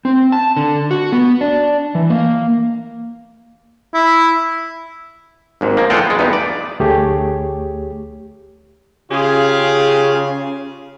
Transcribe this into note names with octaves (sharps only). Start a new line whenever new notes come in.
C4
A5
D3
F#4
B3
D4
E3
A#3
E4
G#1 D#2 G#2
F3 A#3
E2 G#3 F4 A4 F#5 G5
G#3 B3
E2 G2 B3 D#4
D5
D2 A3 G4 G#4 C#5
C#3 F4 G4 G#4